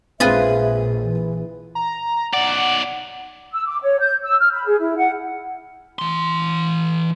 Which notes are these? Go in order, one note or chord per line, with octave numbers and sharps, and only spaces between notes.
A#1 G#3 C4 F4 G#4 B4 E5
E3
A#5
B1 D5 F#5
E6
D6
C#5
G6
E6
F6
B5
G#4
E4
F#5
E3 C6